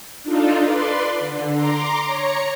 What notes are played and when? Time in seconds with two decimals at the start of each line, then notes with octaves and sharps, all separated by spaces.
0.23 D4 D#4 F4 A4
0.61 B4 D5 C6
1.20 D3
1.53 A#5 C6 D6
2.06 C#5 A#5 C#7